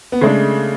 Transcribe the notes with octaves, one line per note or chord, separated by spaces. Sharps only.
B3
C#3 G#3 A3 D4